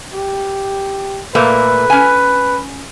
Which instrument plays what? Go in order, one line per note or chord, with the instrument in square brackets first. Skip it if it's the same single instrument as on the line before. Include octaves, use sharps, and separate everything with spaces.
[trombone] G4
[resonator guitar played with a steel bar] A#2 A3 A#3 [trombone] B4
[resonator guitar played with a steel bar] C#4 G#5